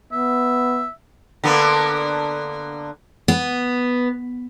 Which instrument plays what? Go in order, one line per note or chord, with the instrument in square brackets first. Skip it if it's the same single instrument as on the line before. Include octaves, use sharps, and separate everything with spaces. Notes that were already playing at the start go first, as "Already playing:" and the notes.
[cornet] B3 [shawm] E5
[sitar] D3 A#3 B3
[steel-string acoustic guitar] B3